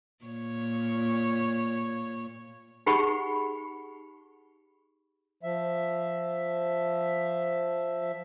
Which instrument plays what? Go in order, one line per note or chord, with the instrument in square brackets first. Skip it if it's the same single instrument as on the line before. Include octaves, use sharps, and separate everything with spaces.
[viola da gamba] A#2 C#5
[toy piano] D#4 G4 G#4 F#5 B5 C#6
[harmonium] F3 E5